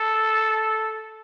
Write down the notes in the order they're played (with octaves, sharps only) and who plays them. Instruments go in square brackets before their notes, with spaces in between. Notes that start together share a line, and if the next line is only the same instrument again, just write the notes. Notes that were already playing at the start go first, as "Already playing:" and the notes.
Already playing: [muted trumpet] A4